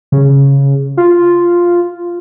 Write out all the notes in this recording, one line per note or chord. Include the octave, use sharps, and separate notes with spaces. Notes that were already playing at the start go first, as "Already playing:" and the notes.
C#3
F4